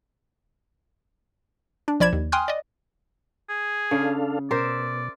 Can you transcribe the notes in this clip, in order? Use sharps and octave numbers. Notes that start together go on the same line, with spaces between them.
D4
B1 F3 D5 B5 G#6 E7
D#2
G5 G#5 C6 D#6 F6 F#6
D5 D#5
G#4
C#3 D4 A4 F5
B2 A#4 C5 D5 E5